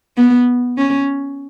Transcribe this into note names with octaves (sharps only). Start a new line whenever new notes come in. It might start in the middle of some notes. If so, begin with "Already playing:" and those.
B3
C#4